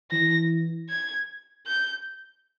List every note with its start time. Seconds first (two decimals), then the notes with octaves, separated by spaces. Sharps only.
0.11 E3 A#6
0.89 G#6
1.66 G6